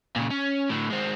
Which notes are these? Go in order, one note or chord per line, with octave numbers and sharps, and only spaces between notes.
A#2 C#3
C#4
A2 D3
G#3 C4